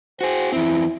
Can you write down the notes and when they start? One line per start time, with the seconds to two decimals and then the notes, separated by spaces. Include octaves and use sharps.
0.21 F#4 G#4 C5
0.52 E2 C4 E4